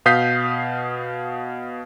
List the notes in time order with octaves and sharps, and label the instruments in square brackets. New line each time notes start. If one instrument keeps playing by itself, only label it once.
[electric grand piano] B2 F5 D#6 G6 B6 C7